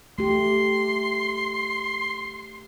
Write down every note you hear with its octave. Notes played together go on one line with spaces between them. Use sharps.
A3 G4 C6